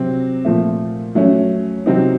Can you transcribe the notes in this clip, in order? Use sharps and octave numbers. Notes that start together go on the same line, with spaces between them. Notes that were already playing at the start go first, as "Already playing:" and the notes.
Already playing: C3 F#3 C4
A#2 F3 A3
F#3 A3 C#4
C3 F#3 C4 D#4